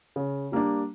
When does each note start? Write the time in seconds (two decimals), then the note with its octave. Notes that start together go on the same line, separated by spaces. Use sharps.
0.16 C#3
0.52 G3 A#3 D4